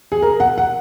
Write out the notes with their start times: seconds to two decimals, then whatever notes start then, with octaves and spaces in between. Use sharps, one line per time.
0.12 G#4
0.22 A#4
0.40 F#5
0.58 F#5